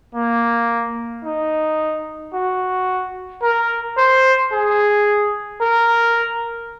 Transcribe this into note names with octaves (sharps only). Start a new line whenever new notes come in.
A#3
D#4
F#4
A#4
C5
G#4
A#4